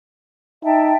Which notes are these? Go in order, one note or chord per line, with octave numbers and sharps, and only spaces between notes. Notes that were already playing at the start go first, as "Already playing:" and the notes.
D#4 E5 G5 A5